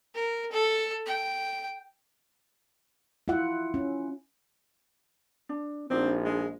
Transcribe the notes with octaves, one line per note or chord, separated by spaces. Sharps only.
A#4
A4
G5
E4 F4 E5 F#5
C#4
D4
A#1 C4 D4 D#4 F#4
G#3